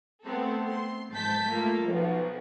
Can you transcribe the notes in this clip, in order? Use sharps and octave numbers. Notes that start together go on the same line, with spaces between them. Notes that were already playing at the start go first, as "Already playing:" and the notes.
A3 B3 C4 A4
C6
G#2 A5 G6 A6 B6
A3 A#3 F4 A4
B1 F3